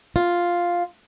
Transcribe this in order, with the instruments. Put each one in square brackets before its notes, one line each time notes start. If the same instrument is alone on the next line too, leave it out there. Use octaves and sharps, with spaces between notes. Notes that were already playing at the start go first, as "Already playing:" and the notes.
[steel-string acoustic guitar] F4